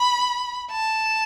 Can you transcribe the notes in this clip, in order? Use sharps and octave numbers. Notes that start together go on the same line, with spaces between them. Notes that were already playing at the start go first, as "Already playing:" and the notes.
Already playing: B5
A5